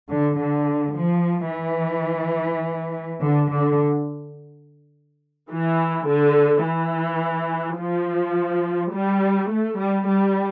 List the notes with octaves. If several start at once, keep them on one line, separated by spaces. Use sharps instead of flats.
D3
D3
F3
E3
D3
D3
E3
D3
E3
F3
G3
A3
G3
G3